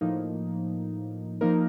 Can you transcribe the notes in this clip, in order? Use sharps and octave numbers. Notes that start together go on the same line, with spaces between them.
A2 F3 A#3 D#4
F3 A#3 D#4 A#4